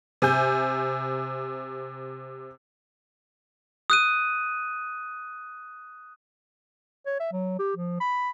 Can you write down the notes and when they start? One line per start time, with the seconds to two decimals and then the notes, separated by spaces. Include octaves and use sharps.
0.22 C3 G#5 G6
3.90 D#6 F#6 D#7
7.06 C#5
7.20 E5
7.32 F#3
7.59 G4
7.76 F3
8.00 B5